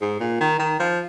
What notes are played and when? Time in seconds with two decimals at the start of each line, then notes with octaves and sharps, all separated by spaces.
0.01 G#2
0.20 A#2
0.41 D#3
0.59 D#3
0.80 F3